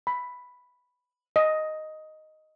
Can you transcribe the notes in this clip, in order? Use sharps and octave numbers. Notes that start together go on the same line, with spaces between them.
B5
D#5